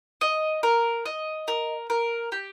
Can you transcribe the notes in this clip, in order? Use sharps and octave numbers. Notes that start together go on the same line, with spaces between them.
D#5
A#4
D#5
A#4
A#4
G4